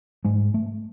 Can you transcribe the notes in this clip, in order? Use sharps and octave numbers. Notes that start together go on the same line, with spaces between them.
G#2 G#3
A3